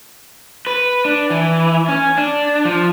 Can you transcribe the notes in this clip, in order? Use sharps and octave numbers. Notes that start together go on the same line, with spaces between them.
B4
D4
E3
C#4
D4
F3